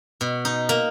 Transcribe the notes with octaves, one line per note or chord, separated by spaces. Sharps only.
B2
D#4
A#3